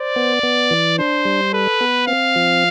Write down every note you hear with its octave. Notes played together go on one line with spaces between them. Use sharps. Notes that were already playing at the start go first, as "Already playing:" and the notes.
Already playing: C5 D5
B3
B3
E3
D4 C5
G3
A4 B4
B3
C4 F5
F3